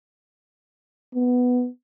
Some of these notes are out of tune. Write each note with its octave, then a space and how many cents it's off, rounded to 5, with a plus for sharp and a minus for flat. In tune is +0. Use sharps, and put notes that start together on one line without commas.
B3 +5